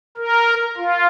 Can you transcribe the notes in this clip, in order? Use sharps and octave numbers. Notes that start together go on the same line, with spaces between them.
A#4
F4